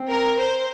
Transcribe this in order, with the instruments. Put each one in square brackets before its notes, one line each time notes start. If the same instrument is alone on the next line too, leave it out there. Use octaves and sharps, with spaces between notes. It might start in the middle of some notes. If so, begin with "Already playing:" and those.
Already playing: [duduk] C4
[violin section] A#4
C5